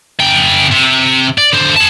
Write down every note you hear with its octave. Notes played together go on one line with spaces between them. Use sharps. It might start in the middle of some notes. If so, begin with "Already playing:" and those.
C#3 G5
C3
D5
D3 C5
G#4 A5